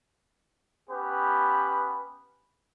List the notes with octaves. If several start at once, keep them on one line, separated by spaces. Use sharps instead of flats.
B3 C#4 G4 B4